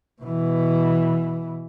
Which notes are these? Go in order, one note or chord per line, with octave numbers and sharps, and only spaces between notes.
B2 E3